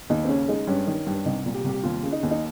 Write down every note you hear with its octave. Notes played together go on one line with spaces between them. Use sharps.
D#2 D#4
C4
C#3 C#4
G#3 D#4
G2 C#4
D#3
G2
C2 D#4
A#2
G4
C2 G4
D#2 F4
C#3
D#4
D#2
D#4